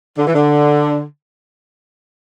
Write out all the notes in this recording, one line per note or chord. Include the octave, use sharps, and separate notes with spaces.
D3
E3
D3